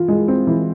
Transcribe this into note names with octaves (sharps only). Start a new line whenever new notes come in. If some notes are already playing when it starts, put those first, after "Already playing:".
Already playing: E3 F4
G#3
C4
E3